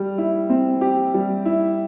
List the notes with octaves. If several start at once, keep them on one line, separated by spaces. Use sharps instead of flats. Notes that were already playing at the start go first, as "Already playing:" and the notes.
Already playing: G3 G4
E4
C4
G4
G3
E4